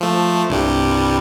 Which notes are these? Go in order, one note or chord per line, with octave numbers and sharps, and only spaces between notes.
F3 A3
C2 G2 G3